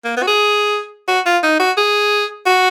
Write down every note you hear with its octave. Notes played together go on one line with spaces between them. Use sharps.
A#3
B3
F#4
G#4
F#4
F4
D#4
F#4
G#4
F#4